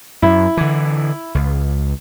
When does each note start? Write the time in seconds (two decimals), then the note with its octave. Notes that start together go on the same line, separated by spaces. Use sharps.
0.22 F#2 E4
0.57 D3 E3
1.35 C#2